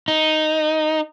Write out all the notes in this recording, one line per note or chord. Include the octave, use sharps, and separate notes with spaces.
D#4